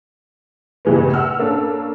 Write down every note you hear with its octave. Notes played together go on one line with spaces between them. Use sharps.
C#2 G2 A#2 E3 G#3 B3
F#5 E6 F6
A#3 C#4 D4 A4